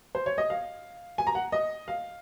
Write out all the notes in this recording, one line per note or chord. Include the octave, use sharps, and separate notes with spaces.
C5
C#5
D#5
F5
G#5
A#5
F#5
D#5
F5